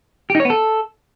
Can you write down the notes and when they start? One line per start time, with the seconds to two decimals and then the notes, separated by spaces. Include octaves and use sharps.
0.30 G4
0.35 D#4
0.40 C#5
0.45 B3
0.50 A4